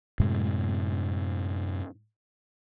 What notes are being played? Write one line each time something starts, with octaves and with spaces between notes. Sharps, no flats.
F#2 A2 C3 G#3